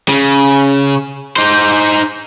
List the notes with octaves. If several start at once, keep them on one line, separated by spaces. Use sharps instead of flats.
C#3
D#4 C5